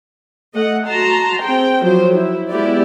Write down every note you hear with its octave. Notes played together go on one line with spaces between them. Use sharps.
A3 D#5 F#5
F#4 A5 A#5 C6
C4 G#4 G5
F3 F#3 C5
E4
G#3 B3 E4 G4 D5